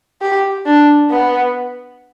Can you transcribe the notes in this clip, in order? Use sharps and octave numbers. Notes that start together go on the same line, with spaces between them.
G4
D4
B3